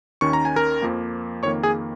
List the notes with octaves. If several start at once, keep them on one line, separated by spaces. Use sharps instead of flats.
D#2 D#3 C#4 C#6
A#5
G#5
A#4 A#5
F2 F3 A#3
F2 D#3 A#3 C#5 C#6
G#4 G#5